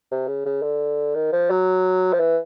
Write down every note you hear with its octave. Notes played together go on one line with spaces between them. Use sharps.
C3
C#3
C#3
D3
D#3
F3
F#3
F3
E3